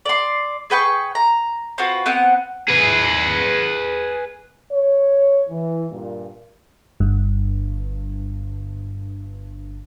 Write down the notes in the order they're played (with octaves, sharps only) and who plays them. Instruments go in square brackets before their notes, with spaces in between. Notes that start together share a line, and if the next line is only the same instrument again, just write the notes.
[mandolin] D5 C6
G#4 B4 G5 C#6
A#5
C4 F4 F#4 B4
B3 C4 F#5
[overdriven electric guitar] G#4 B4
[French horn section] C#5
E3
G2 A#2
[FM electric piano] G1 G2